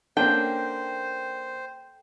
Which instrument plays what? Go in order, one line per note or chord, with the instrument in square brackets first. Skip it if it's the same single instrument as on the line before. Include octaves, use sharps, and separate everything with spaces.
[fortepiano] A#3 C#4 D4 [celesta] A4 A5 [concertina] C5 [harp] G5